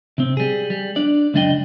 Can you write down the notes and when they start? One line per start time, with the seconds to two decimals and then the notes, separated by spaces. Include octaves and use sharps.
0.18 C3 C4
0.37 G3 G#4
0.70 G3
0.96 D4 D5
1.34 C#2 F#2 D4 D#5 G5